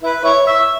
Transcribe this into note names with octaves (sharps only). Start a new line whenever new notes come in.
E4 B4
E4 C#5
E5